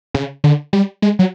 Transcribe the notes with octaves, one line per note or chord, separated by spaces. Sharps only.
C#3
D3
G3
G#3
F#3